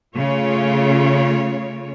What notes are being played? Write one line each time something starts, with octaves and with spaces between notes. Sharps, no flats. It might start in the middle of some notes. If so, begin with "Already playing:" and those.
C#3 A3 F4 C#5